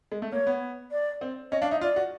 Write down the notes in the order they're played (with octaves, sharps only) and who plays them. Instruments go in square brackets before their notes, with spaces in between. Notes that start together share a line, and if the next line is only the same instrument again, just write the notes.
[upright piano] G#3
A3
[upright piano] A#3 [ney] C#5
[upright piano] B3
[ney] D5
[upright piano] C4
[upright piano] C#4 [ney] D#5
[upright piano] D4 [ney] F5
[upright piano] D#4 [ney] E5
[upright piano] F4 [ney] D5
[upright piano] F#4